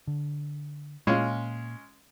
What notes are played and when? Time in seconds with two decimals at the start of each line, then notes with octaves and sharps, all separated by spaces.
0.07 D3
1.07 A#2 G#3 C#4 F4